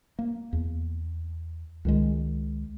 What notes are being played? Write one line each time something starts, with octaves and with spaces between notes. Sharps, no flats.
A#3
E2
C#2 D#3 G#3